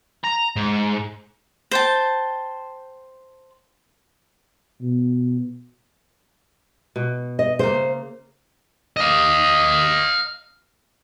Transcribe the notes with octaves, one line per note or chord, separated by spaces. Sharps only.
A#5
G#2
C5 G5 A5
B2
B2
D#5
C#3 A#3 C5
D#5 F5